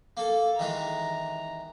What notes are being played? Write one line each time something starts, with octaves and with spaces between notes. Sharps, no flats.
A#3 A4
D#3 E3 G#3 A#5